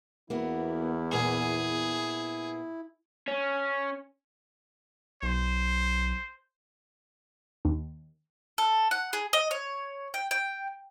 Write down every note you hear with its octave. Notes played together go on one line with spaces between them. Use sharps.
E2 A#3 B3 E4 F#4
A#2 B3 G#4 G#5
C#4
B1 C5
D#2
A4
F#5
G#4
D#5
C#5
G5
G5